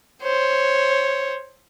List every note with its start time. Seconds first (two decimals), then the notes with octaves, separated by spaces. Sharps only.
0.23 C5 C#5